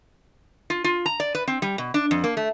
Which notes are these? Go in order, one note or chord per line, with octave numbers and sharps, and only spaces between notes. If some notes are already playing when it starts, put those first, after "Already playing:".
F4
F4
A#5
D5
B4
C4
G3
B2
D4
F2
A#3
A3